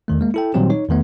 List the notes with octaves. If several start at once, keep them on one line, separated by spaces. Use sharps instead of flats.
E2 D#3 A3
G#3 A#3
E4 A4 G5
A#2 D#3 F#3 G3 C4 G4
D#4 C#5
E2 D#3 A3 B3